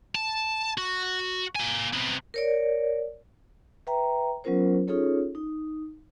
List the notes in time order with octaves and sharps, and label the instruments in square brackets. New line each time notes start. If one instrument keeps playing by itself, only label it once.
[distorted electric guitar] A5
F#4
A#3 G#5
C3 B3
[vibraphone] A#4 C#5 D5
B4 E5 G5 A#5
F#3 B3 C#4 F4 A#4 C5
C#4 D#4 F4 G#4 A4 C#5
D#4